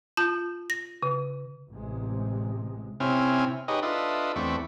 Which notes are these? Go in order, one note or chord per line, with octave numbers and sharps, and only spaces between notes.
F4 A5 G6
A#6
C#3
A1 C3 G#3
C3 C4 C#4 E4 G#5 F6
D#4 G4 G#4 B4 C#5 D#5
D4 F4 A4 B4 D#5 E5
E2 A3 C4 D5 B5 C#6